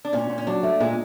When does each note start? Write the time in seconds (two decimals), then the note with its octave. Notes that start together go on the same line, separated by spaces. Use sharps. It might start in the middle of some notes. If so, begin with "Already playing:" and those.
0.05 D4
0.13 A#2 C#4
0.29 A#2
0.38 C#4
0.47 F#3 D4
0.63 A3
0.80 A#2 G#3